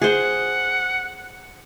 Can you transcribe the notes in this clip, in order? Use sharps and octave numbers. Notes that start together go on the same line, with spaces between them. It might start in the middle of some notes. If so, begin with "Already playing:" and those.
G#4 C5 F#5